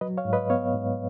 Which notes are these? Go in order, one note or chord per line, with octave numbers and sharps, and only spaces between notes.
F#3 B4 D#5
C#5 F5
G#2
B4 D#5
B3 C#5 F5
G#2